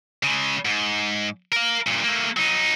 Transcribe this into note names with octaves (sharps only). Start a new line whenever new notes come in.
C#3 G#3
G#2
A#4 F5
G2 A#2
A3 A#3
F#3 D#4